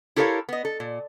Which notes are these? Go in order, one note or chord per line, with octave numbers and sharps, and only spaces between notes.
E4 G4 A4 A#4 C#5 F5
B3 D#5
A4
A#2